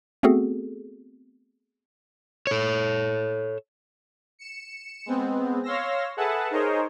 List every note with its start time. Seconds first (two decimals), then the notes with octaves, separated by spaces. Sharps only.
0.23 A3 B3 C4 F#4 G#4 A4
2.47 A4 C#5
4.39 C#7 E7
5.06 G#3 B3 C4
5.63 C#5 F5 C6 E6 A#6
6.17 G#4 A4 B4 E5 F#5 A5
6.51 D#4 G#4 A#4 C5 C#5 D#5